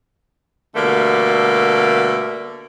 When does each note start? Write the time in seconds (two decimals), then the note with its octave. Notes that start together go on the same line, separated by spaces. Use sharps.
0.76 B2 D3 G3 A3 A#3